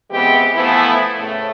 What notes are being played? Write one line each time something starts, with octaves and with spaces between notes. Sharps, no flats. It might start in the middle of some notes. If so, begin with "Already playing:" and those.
E3 G#3 B3 C4 G4
E3 F3 A3 B3 E4
A2 C#3 A3